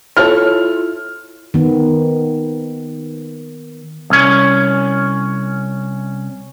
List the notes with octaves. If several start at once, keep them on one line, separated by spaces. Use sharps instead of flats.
E4 F4 A4 C#5 F6
D#3 B3
C2 C#4